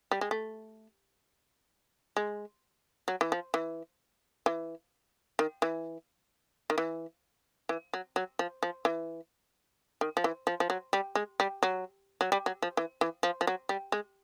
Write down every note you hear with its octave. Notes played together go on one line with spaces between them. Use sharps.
G3
G#3
A3
G#3
F#3
E3
F3
E3
E3
D#3
E3
D#3
E3
E3
F#3
F#3
F3
F3
E3
D#3
F3
E3
F3
F3
F#3
G3
G#3
G3
F#3
F#3
G3
F#3
F3
E3
E3
F3
F3
F#3
G3
G#3